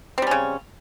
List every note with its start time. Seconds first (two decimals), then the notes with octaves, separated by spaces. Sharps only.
0.18 C4
0.22 G3
0.27 C#4
0.31 C#3